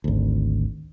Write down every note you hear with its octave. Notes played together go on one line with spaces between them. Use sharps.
G#1 D2